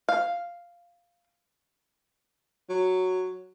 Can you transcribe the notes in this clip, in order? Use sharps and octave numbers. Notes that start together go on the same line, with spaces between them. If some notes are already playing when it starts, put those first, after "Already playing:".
F5
F#3